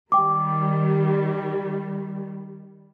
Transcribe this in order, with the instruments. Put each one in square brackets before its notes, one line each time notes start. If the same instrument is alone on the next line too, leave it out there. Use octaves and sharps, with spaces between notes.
[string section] D#3 G3 [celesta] G5 D6